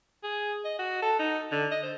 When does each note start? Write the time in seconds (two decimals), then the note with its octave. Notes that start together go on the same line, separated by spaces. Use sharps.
0.24 G#4
0.65 D#5
0.79 F#4
1.02 A4
1.19 D#4
1.52 D3
1.71 D#5
1.83 C5